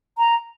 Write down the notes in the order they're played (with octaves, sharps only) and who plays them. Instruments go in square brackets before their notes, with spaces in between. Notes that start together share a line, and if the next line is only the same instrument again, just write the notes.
[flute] A#5